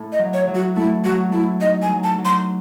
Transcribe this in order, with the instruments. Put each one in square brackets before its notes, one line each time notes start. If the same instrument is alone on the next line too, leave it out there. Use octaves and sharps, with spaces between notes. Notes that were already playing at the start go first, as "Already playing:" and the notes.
Already playing: [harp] A2
[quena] D#5
[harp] F#3
[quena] C#5
[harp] F#3
[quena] F#4
[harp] A3 [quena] E4
[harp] F#3 [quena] F#4
[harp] A3 [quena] E4
[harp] D#4 [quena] D#5
[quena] G#5
[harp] F#3
[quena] A5
[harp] F#3
[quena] C6